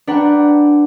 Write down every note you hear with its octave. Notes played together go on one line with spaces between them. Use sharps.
D4 B4 F#5 G5 A#5